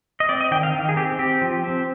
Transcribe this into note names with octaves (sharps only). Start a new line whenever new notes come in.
D#5
C4 D5
D#5
D#3 G5
F5
D#3
G#4
C4 G4
C4 G4
F3
C4